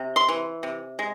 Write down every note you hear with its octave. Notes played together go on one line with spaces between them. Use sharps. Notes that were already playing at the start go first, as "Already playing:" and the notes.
Already playing: C3
C6
E3
C3
G#3